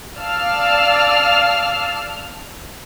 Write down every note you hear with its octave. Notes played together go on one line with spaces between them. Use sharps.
D5 F5 A5 E6 F6